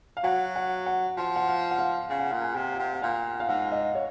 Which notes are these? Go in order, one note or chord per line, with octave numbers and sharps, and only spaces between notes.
F5
F#3 F#5
F#5
F#5
F3 F#5
F#5
F5
F#5
F5
C#3 F5
F#5
A#2 F5
G#5
C3
F#5
C3
F#5
A#2 F5
F5
G#2 F#5
D#5
C#5